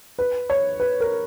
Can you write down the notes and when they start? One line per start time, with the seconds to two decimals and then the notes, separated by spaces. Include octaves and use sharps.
0.19 B4
0.50 C#5
0.80 B4
1.00 A#4